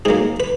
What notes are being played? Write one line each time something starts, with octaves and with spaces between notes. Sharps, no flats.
G#2 F#3 A#3 G#4
B4